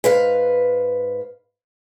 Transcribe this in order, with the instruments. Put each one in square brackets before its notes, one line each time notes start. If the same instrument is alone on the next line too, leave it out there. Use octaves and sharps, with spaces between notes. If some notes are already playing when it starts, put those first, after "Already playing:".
[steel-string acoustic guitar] G#2 B4 F5